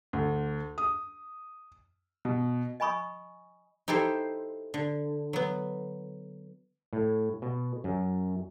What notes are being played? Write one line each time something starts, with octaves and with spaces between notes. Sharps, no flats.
D2
D#6
B2
D#5 G#5 B5 C#6 D#6
D#4 E4 G4 A4 C5
D3
F#3 B3
A2
B2
F#2